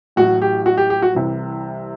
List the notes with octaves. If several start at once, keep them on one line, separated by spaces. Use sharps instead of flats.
A1 A2 F#3 F#4
G4
F#4
G4
G4
F#4
C2 C3 E3